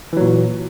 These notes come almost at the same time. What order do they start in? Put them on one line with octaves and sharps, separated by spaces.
E3 F#3 A#2